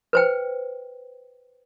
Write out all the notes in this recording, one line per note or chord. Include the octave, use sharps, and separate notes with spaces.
B4 C5 G5